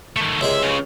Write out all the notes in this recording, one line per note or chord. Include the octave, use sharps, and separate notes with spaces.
D#3 A3
C#2 C3 G#3 E5
C#3